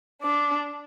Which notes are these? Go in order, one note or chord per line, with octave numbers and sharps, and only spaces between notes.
D4 D6